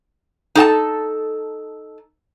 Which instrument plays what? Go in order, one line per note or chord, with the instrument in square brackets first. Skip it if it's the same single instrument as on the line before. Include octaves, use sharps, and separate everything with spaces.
[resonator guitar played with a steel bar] D#4 A4 G5 A5